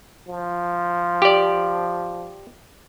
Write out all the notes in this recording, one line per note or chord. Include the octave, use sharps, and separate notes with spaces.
F3
G4 D5